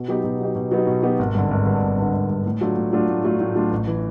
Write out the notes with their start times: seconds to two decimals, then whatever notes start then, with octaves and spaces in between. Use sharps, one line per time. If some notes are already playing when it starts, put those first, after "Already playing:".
Already playing: B2
0.08 F#3 B3 D#4 G4
0.24 B2
0.40 F#3 B3 D#4 G4
0.56 B2
0.72 F#3 B3 D#4 G4
0.87 B2
1.03 F#3 B3 D#4 G4
1.19 G#1
1.35 G2 D3
1.51 G#1
1.66 G2 D3
1.82 G#1
1.98 G2 D3
2.14 G#1
2.30 G2 D3
2.45 A2
2.61 F#3 A3 D4 F4
2.77 A2
2.93 F#3 A3 D4 F4
3.09 A2
3.24 F#3 A3 D4 F4
3.40 A2
3.55 F#3 A3 D4 F4
3.72 A1
3.87 E3